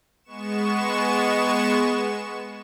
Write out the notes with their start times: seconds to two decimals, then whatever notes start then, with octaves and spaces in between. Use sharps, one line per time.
0.24 G#3 B3 C#6 E7